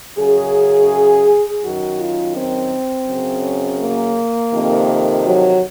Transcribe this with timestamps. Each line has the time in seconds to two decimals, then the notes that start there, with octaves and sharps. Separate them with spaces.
0.19 F#2 C#3 G#4
1.63 F#2 D#3 F#4
1.99 F4
2.35 C4
3.08 F#2 C#3
3.80 A#3
4.52 F2 C3 D#3
5.24 F#3